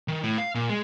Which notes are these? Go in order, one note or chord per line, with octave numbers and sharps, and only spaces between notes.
D#3
A2
F5
A#2
G#3